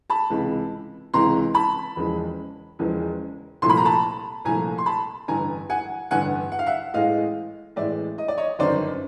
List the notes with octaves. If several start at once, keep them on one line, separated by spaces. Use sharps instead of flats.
A5 B5
C#2 C3 E3 G#3
C#2 C3 E3 G#3 A#5 C6
A5 B5
E1 E2 C#3 F3 G#3
E1 E2 C#3 F3 G#3
C2 A#2 F3 A3 C6
B5
A#5
A5 B5
C2 A#2 F3 A3 G#5 A#5
C6
A5 B5
A1 G2 D3 G#5 A#5
F#5 G#5
A1 G2 D3 F#5 G#5
F#5
F5
E5 F#5
A1 A2 E3 G#3 D#5 F5
A1 A2 E3 G#3 D5 E5
D#5
D5
C#5 D#5
G1 F#2 D#3 C5 D5